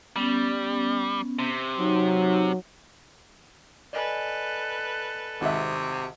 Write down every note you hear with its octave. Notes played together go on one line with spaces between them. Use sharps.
G3 B3 C#4
C3
F#3 D#4
A4 B4 D5 D#5 G#5
G#1 C3 E5